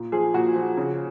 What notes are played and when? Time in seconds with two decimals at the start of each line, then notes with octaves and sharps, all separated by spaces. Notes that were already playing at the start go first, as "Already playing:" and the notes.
Already playing: A#2
0.12 F3 G#4
0.34 A#2 F#4
0.55 F3
0.77 C#3